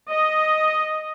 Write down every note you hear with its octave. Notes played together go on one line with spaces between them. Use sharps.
D#5